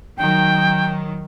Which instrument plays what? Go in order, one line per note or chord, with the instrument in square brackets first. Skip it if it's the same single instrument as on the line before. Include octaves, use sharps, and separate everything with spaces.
[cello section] D#3 F#3 [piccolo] G5